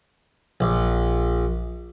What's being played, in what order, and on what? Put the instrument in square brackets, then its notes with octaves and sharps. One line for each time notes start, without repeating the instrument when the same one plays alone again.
[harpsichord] A#1